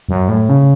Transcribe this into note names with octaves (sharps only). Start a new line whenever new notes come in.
F#2
A2
C#3